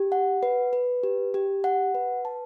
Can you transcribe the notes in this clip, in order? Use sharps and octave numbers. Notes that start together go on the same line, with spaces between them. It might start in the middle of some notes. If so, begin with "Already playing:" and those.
Already playing: G4
F#5
B4
B4
G4
G4
F#5
B4
A5